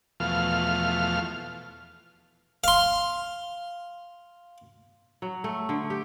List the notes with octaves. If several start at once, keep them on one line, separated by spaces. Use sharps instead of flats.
E2 B2 F3 A3 F5 F6
F5 C6
F#3
A3
D3
G4